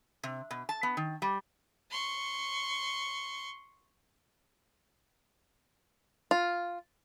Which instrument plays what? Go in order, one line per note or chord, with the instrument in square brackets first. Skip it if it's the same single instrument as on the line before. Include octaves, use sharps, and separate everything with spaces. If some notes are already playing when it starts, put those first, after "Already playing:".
[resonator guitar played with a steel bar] C3
B2
A5
B3
D#3
G3
[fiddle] C6 C#6
[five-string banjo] F4